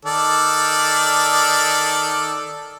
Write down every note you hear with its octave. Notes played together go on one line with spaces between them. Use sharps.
D#3 A4 D5